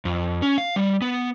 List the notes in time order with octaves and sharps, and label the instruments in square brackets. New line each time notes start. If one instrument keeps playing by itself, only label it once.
[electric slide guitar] F2
C#4
F5
G3
B3